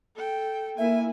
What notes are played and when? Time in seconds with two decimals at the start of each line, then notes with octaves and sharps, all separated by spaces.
0.16 A4 G5
0.78 A#3 E4 E5 G#5